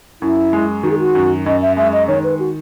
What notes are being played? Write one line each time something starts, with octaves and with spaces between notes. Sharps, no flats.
F#2 E4
G#3
D#3 F#4
G#4
F#4
F#2
F#2 D#5
E5
G#3 E5
D#5
D#3 C#5
B4
F#4